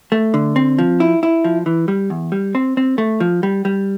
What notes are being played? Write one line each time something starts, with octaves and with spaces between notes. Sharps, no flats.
A3
D3
C4
F3
E4
E4
F3
E3
G3
E2
G3
C4
C4
A3
F3
G3
G3